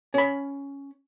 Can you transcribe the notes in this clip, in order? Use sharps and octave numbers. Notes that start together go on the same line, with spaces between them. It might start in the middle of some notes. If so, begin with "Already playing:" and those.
C#4 B5